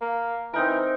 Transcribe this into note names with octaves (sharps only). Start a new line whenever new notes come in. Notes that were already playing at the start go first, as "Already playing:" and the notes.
A#3
E3 C4 D#4 A#4